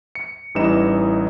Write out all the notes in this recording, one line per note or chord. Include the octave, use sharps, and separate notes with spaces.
C#7
A1 E3 G3 D#4 E7